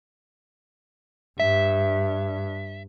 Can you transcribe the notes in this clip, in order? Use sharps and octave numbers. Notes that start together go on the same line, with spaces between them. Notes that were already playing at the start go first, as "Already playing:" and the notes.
G2 E5